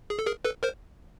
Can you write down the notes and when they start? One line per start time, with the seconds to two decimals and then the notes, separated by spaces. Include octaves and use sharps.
0.10 G#4
0.19 A4
0.26 G#4 A#4
0.45 A4 B4
0.63 A#4 C5